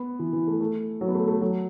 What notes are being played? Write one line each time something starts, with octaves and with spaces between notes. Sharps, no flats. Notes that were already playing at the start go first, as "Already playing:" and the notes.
Already playing: B3
E3
E3
A3
A3
F#3
B3
A3
A3
F#3